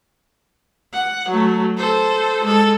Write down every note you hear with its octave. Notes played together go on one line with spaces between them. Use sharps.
F#5
F#3 A3
A4 C5
G#3 A4